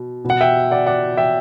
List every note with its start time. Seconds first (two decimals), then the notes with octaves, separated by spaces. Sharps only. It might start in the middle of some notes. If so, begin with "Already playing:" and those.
Already playing: B2
0.25 B2
0.30 F#5
0.41 E5 G5
0.71 D5 F#5
0.86 D5 F#5
1.17 E5 G5